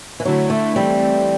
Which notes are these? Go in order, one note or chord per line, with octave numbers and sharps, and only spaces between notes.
E3
D3 F#3 A3 E4
A3
E3 G3 A3 C4